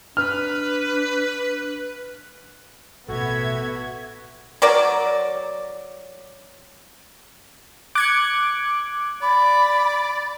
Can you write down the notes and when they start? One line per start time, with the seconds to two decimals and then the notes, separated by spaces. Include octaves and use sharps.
0.17 D4 B4 F6
3.08 A1 B2 B3 F#4 A4 E5 G#6
4.62 F#3 A#4 D5
7.95 D6 F#6 G#6 C#7
9.22 D5 B5